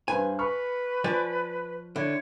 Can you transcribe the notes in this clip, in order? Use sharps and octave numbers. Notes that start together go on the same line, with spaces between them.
G2 B4 C5 G#5
B4 B5 C#6 F6
F3 D5 G#5
D3 E4 C#5